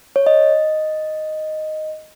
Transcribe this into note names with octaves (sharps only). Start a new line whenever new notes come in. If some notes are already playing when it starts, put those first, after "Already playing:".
C#5
D#5